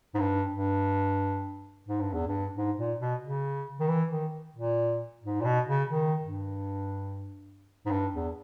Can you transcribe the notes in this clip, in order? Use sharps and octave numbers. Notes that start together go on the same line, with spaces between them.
G#2
G2
G2
G#2
G2
E2
G2
G#2
A#2
B2
C#3
D#3
E3
D#3
A#2
G#2
A#2
B2
C#3
D#3
G2
G#2
G2
E2